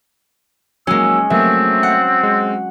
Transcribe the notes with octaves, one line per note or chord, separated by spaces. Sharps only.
F#3 G#3 A#3 C#4 E6
F#3 A3 A#3 C4 E5
F#5
G#3